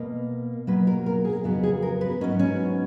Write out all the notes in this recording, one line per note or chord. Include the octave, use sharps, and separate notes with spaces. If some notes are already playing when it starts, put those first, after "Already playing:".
Already playing: B2 A#3
B2 F#3 A#3 B4
A#4
A#4
G#4
F2 C#3 F#3 B3
G#4
A#4
B4
G#2 F#3 B3 C#4
C#4